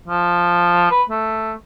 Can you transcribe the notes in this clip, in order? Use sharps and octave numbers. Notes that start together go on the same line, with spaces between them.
F3
B4
A3